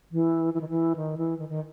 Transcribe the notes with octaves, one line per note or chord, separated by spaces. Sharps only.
E3
E3
D#3
E3
D#3
E3
D#3
D#3